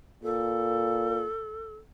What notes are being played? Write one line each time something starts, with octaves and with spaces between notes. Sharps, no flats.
A#2 A4